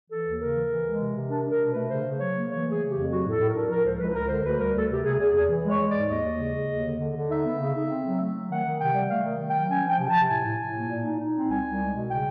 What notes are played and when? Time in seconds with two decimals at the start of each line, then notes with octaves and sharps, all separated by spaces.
0.10 E3 A4
0.25 D#2
0.40 C#3 A#4
0.55 E3
0.70 E3
0.85 G#3
0.99 C3
1.14 C3
1.29 D4 A#4
1.45 D4 A#4
1.59 B2
1.69 A3 B4
1.90 C#3 C5
2.04 C#3
2.19 F#3 C#5
2.35 A#3
2.50 E3 C#5
2.65 A3 G#4
2.80 C#3
2.89 G4
2.94 F2
3.09 F#3 F#4
3.25 A2 A4
3.39 A2
3.49 A#4
3.55 D4
3.69 F3 A#4
3.84 C#2 C5
3.99 C#2 B4
4.15 C#2 A#4
4.29 D3 C5
4.44 D2 B4
4.59 G3 A#4
4.74 D2 A4
4.89 C3 G4
5.05 C3 G#4
5.19 E2 G#4
5.34 E2 G#4
5.49 E3
5.64 G#3
5.70 C#5
5.79 G#3
5.89 G#2 D5
6.09 D#2 D#5
6.24 D#2
6.39 C#3
6.55 C#3
6.70 D#2
6.85 D3
6.99 D3
7.14 D3
7.29 D#4 E5
7.44 B3
7.59 C#3
7.74 D#4
7.89 C4
8.05 F#3
8.19 A3
8.34 F#3
8.49 D#3 F#5
8.65 D#3
8.79 C3 G5
8.94 G3
9.09 A3 F5
9.25 D#3
9.40 D#3
9.49 G5
9.55 F#3
9.69 C#4 G#5
9.84 F3
9.89 G5
9.99 C3
10.09 A5
10.14 C3
10.29 A2 G#5
10.44 A2
10.60 A2
10.75 A#3
10.89 A#2
11.04 D#4
11.19 D#4
11.34 C4
11.49 C2 G#5
11.65 C2
11.80 G#3
11.95 B2
12.10 C#3 G5